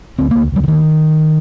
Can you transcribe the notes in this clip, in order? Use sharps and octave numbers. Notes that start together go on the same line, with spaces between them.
D2 C4
D2 A#3
D2 G3
D3
D2 D#3